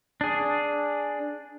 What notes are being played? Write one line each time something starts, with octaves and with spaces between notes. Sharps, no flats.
D4 G#4